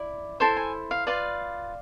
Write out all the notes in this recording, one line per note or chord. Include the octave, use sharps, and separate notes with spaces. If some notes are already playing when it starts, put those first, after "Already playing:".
Already playing: E4 D5
E4 A4 C5 C6
G#5
F5
F4 B4 D5 F5